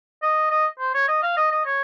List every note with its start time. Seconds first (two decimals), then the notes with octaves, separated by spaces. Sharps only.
0.22 D#5
0.51 D#5
0.79 C5
0.94 C#5
1.08 D#5
1.23 F5
1.37 D#5
1.51 D#5
1.66 C#5